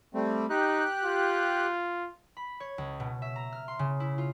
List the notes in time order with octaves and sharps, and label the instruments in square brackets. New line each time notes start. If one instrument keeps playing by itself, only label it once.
[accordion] G3 A3 C4
[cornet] D#4 [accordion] G4 F#6
[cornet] F4
[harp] B5
C#5
C#2
B2
E5
A#5
F6
C6
C#3
E4
F4